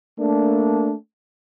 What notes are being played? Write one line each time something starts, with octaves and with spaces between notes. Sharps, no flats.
A3 A#3 D4